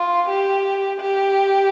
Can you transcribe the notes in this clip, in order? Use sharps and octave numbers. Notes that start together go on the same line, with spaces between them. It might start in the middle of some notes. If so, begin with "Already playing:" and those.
Already playing: F4
G4
G4